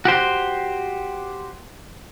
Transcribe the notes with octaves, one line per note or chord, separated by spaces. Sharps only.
F#4 G4 C5